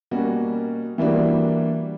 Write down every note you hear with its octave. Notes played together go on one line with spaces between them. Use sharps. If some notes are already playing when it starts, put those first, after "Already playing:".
B2 G3 A#3 C#4 F#4
E3 G3 A#3 D4 F#4